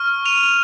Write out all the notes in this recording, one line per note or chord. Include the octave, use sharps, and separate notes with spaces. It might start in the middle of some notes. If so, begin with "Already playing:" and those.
Already playing: C#6 F6
D#7 F7